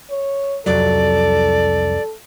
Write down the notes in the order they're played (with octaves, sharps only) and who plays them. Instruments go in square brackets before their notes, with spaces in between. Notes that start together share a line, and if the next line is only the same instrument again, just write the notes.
[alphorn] C#5
[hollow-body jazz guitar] C2 F2 F#3 [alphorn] A4 [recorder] D5